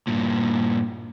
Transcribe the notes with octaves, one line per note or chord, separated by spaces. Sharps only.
G2 A#2